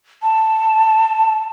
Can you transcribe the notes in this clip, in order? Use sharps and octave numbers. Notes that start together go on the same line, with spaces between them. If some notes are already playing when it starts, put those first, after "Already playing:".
A5